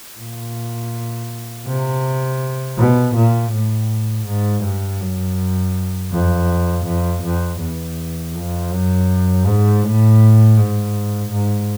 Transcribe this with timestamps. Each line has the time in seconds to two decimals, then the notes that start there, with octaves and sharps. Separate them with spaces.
0.19 A#2
1.67 C3
2.78 B2
3.15 A#2
3.52 A2
4.26 G#2
4.64 G2
5.01 F#2
6.12 F2
6.86 F2
7.23 F2
7.60 E2
8.35 F2
8.71 F#2
9.46 G#2
9.83 A2
10.57 G#2
11.31 G#2